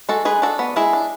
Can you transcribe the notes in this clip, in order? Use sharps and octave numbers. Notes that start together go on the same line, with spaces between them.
G#3 F#4 A4
G#3 G#4 B4
D4 F#4 A4
B3
G#3 E4 G#4
D4